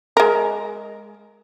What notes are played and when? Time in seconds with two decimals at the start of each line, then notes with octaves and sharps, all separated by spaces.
0.17 G#3 A#4